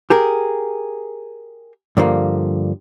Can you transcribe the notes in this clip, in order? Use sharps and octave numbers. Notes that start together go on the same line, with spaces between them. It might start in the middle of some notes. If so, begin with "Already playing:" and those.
G4 G#4 A#4
G2 D3 F3 A#3